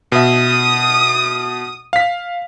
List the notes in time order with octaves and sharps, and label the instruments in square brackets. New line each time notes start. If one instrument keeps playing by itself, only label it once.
[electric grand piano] B2 E5 [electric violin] D#6
[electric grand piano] F5 B6